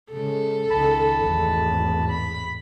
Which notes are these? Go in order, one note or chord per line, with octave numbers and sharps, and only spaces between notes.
C#3 G#3 A4
C#2 D#3 A5 B5
G#1 E2 A2
B5